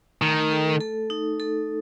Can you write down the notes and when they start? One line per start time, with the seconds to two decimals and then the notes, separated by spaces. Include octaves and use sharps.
0.22 D#3 A3
0.51 A4
0.81 A4
1.10 D#4
1.40 A4